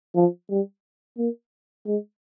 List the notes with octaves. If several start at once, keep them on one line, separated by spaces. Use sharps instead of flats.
F3
G3
A#3
G#3